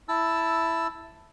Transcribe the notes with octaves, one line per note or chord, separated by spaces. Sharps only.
E4 A5 E6